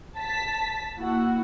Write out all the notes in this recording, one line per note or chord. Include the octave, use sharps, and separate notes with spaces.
A5 B6
A#3 E4 F#4 F#5